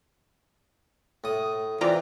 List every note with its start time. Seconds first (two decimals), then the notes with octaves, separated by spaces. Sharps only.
1.24 A2 D#6
1.81 E3 C4 F4 D5 A#5